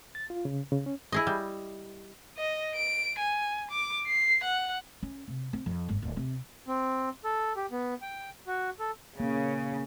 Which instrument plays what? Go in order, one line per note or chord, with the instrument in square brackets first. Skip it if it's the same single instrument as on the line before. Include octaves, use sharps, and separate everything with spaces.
[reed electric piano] A6
F4
C#3
C#3
C#4
[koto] E4 G#4 D#5
G3
[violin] D#5
D7
G#5
D6
C7
F#5
[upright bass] C#4
C3
C4
F2
G1
D1
C3
[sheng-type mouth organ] C4
A4
G4
B3
G5
F#4
A4
[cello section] C#3 [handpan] A#3